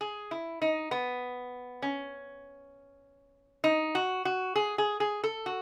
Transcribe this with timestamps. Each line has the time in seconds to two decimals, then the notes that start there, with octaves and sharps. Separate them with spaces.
0.01 G#4
0.31 E4
0.62 D#4
0.91 B3
1.82 C#4
3.64 D#4
3.95 F#4
4.25 F#4
4.56 G#4
4.78 G#4
5.00 G#4
5.24 A4
5.46 F#4